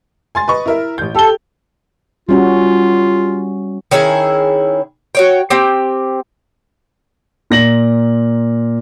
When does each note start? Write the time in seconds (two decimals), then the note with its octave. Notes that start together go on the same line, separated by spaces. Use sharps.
0.35 G#5 C6 A6
0.48 B4 D#5 C#6
0.66 E4 A#4 E5
0.98 A1 G6
1.15 G4 A4 G7
2.29 G3 C#4 F4 F#4
3.91 D#3 C#4 E4 G#4
5.15 F#4 C#5 G5
5.50 C4 G4
7.50 A#2 A#6 F#7